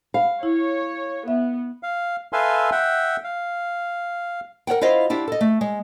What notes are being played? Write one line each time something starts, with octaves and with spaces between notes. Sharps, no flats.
F5 B5
E4 C#5
B3 E5
F5
A4 B4 E5 F5 G#5 C6
E5 F#5 G5
F5
A#4 C#5 F#5 G5
E4 F4 C5 D#5 F5
D4 E4 F4 G4
A4 D#5
A3
G#3